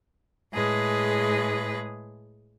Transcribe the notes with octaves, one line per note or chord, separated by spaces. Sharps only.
A2 G#3 G#4 B4